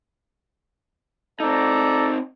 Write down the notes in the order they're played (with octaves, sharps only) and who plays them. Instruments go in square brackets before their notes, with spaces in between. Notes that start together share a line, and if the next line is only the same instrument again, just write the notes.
[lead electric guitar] C4 D#4 [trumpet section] A4 D5 A#5